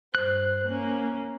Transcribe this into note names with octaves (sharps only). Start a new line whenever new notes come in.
G2 C5 F#6
A#3 C#4